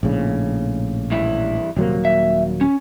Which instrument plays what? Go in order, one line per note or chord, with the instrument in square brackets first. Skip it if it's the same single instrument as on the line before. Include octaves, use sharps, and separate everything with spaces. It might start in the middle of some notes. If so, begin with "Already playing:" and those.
[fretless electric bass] A#1 A2 C#3
[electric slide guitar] G2 E3 E4
[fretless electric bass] D#1 F#3 A#3 [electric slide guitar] C3
[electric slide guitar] E5
C#4